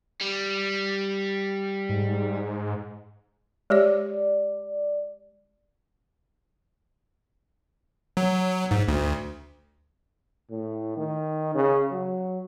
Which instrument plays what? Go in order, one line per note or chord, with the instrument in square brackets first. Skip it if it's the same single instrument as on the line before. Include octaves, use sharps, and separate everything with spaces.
[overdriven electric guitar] G3
[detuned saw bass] G#2
[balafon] G#3 G4 C#5 [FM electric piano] D5
[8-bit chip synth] F#3
G#2
D2
[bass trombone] A2
D#3
C#3
F#3